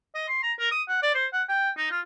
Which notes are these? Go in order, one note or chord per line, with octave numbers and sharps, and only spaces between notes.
D#5
C6
A#5
A#4
D#6
F#5
D5
C5
F#5
G5
D#4
F4